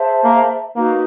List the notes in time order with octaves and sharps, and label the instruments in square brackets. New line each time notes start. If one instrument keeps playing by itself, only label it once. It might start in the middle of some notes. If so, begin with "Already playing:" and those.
Already playing: [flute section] G#4 C5 E5 A5
[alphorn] A#3
[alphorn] A#3 [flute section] D#4 F#4 B4